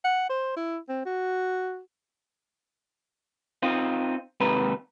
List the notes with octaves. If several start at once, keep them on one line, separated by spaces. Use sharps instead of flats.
F#5
C5
E4
C4
F#4
C4 D#4 F4
D#2 G#2 C3 B4 A#5